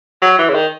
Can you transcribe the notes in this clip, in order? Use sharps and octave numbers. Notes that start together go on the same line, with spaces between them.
F#3
E3
C#3
D#3